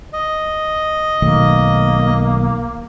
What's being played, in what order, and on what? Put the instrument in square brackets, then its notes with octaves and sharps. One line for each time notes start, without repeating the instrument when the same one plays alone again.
[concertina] D#5
[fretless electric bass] B1 D#3 A3 [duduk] A#3